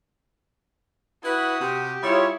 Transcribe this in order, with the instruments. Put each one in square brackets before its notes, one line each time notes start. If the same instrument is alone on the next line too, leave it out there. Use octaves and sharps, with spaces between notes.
[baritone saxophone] E4 [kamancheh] F#4 D#6 [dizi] B4
[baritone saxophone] C3 [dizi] G4
[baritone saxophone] G3 [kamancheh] E4 [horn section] F4 G#4 C#5